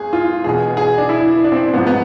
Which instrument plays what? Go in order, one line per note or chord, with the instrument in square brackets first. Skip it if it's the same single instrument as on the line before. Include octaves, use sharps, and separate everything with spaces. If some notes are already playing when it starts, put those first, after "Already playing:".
Already playing: [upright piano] G#1 G#4
F4
E1 E2 B2 G#4
G#4
D4
E4
D4
C4
A1 G#2 F3 B3
B3